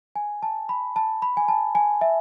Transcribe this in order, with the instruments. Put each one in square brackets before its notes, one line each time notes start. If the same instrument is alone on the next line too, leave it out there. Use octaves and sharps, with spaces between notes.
[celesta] G#5
A5
B5
A5
B5
G#5
A5
G#5
E5